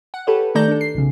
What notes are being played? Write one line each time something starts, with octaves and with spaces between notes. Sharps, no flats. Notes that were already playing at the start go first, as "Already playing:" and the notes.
F#5
G4 A4 B4 C#5
D#3 A3 A4 D5 A#5 G6
D4 A4
C7
B1 C#3